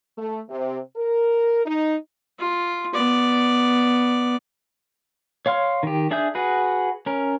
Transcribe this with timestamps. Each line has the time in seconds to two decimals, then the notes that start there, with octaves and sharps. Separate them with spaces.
0.18 A3
0.49 C3
0.96 A#4
1.66 D#4
2.39 F4
2.94 B3 D5
5.46 C#5 F5 C6 F6
5.83 D#3 G4
6.11 D4 G#4 E5 D#6 G6
6.35 F#4 G#4 B4
7.06 C#4 A#4